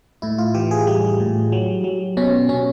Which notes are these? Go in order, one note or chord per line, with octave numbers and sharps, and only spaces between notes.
A2 E4
F4
E3 G4
G#4
G3 G4
A2
F#3
F#3
B2 C#4
B2 C#4